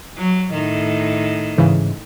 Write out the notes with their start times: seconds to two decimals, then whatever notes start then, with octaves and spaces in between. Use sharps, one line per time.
0.17 F#3
0.54 A2 D#3
1.58 G#2 C#3 E3